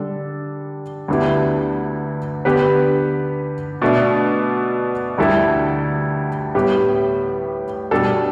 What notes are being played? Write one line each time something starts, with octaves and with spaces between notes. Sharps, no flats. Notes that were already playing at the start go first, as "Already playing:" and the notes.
Already playing: D3 G3 D4 A4
D2 D3 B3 E4 G4
D3 B3 G4 B4
B2 A3 D4
D2 D3 G3 E4 A4
A2 G3 B3 G4 B4
B2 G3 D4 A4